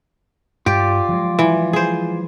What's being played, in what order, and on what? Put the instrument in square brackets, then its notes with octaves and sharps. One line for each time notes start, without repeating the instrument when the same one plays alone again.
[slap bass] G2 [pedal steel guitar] F4 D5 [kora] G4
[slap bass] F3 F#3 G#3
[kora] E3
G#4 C5